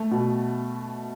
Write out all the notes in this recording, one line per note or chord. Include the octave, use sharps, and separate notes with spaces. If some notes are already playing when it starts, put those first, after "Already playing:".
Already playing: A3
B2